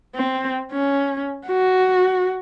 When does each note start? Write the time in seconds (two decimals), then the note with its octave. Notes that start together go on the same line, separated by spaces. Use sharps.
0.15 C4
0.72 C#4
1.47 F#4